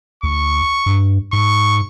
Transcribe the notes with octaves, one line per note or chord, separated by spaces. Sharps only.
D2 C#6
G2
G#2 C#6